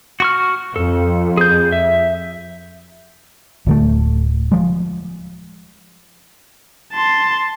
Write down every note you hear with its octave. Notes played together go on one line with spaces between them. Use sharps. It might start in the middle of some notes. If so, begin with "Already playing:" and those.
F#4 C#6 F6
F2 A4
G#4 G6
E5
D1 D2 A3
F3 G#3
A5 C6